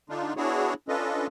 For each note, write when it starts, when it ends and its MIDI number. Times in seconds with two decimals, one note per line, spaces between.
0.09 0.33 50
0.09 0.33 62
0.09 0.33 63
0.09 0.33 65
0.37 0.74 59
0.37 0.74 62
0.37 0.74 64
0.37 0.74 66
0.37 0.74 68
0.37 0.74 73
0.88 1.27 61
0.88 1.27 62
0.88 1.27 65
0.88 1.27 69
0.88 1.27 71
0.88 1.27 75